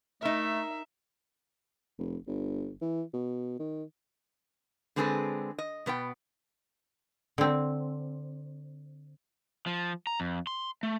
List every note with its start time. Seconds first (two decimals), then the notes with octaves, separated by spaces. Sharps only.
0.22 A3 D#4 A#4 E5
1.99 F1
2.27 G1
2.81 E3
3.14 B2
3.60 D#3
4.96 D3 G#3 C4 G#4 A4 B4
5.58 D#5
5.86 B2 B3 C5 G5
7.38 D3 C4
9.67 F3
10.07 A#5
10.20 F2
10.47 C6
10.83 A3